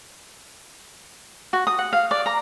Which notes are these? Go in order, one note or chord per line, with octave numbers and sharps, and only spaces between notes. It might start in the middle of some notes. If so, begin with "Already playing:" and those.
F#4
D#6
F#5
F5
D5
A#5